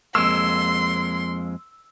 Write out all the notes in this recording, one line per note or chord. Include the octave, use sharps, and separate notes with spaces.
F2 G#3 A#3 C6 E6